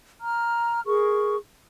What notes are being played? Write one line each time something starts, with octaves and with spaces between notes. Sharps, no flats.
A#5 F6
G#4 A#4 C#6